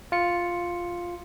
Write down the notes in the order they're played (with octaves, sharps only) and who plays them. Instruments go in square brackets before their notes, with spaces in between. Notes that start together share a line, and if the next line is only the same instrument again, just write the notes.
[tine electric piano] F4 C#7